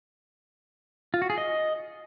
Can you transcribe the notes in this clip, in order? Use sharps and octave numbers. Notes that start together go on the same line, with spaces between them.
F4
F#4
G#4
D#5